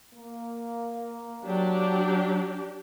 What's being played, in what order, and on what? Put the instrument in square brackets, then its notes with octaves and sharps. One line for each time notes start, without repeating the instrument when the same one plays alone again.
[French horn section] A#3
[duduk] F#3 [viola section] D4 G4